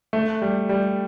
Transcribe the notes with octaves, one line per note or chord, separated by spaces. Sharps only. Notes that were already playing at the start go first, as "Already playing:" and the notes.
A3
G3
G3